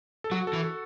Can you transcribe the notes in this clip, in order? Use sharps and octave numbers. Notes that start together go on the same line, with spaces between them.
A4
F#3 F#4
A4
E3
A4